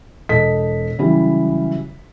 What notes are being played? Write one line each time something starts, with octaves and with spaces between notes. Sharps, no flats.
E1 A4 D#5 B6
C#3 E3 F#3 G3